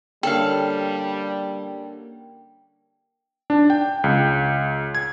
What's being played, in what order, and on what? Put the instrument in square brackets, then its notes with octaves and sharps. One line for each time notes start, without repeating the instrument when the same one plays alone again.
[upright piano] D3 A#3 C#4 [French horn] G3 [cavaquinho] A4 F5 [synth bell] G5
[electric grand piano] D4
G5
C#2
G#6